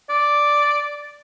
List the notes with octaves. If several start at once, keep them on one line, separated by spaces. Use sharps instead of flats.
D5